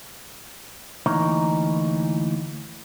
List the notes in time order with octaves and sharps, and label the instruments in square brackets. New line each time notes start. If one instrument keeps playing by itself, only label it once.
[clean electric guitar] D2 E3 A#3 D#4 C#5 A#5